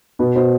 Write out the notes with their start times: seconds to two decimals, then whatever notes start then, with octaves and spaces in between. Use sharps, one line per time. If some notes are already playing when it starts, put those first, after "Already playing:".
0.19 B2 B4
0.35 B2 C5